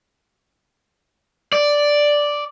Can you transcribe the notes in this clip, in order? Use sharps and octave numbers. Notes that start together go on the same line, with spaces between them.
D5